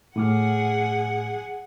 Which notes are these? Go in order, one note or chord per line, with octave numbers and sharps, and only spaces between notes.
A2 G#4 F#5 D6 F6